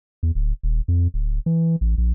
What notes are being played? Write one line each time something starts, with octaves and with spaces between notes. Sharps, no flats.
E2
D1
D#1
F2
D1
E3
A1
A#1